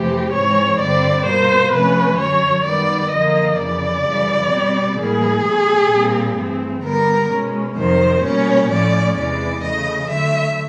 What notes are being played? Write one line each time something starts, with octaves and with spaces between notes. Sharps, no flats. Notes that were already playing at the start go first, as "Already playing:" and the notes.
Already playing: F2 C3 E3 A3 C4 G4
G#2 E3 G#3 C4 C#5
G2 D3 G3 C4 D5
B2 G3 A#3 C5
C3 F3 A3 C#4 B4
F#2 D3 F#3 C#5
F#2 D#3 G3 B3 D5
F#2 D3 F3 A#3 D#5
F2 C#3 E3 D5
F#2 C#3 E3 G3
B2 G3 C4
A2 E3 G3 A#3 G#4
B2 F#3 A3
A#2 G3 C4
G2 E3 A3 C4
D3 G3 B3 A#4
B2 G#3 C#4
F2 C3 D#3 F#3 C5
B2 G3 A#3 C#4 C#5
A2 F3 A3 C#4 D5
E2 C3 E3 G#3 D5
C#3 E3 A3 D#5
D3 F#3 A3 E5